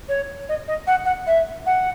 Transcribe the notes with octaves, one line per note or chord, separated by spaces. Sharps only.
C#5
D#5
D#5
F#5
F#5
E5
F#5